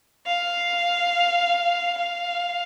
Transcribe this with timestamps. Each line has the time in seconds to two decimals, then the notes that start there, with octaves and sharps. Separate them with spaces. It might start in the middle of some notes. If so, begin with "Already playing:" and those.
0.26 F5
1.98 F5